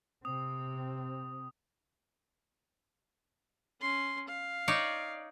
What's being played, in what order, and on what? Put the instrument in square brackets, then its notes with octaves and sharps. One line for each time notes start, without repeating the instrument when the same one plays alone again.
[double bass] C3 C4 [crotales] D#6
[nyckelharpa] C#4 C6
F5
[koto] D#4 C#5 D5